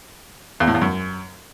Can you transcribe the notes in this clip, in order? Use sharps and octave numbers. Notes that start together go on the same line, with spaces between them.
E2
A2
E2
F#2